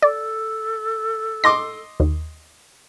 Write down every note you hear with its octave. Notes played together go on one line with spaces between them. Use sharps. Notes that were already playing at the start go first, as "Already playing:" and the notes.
A4 D5
D#5 C6 D6 A#6
D#2